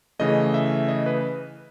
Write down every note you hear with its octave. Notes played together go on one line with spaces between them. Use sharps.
C#3 E3 A3 D#5
E5
D#5
B4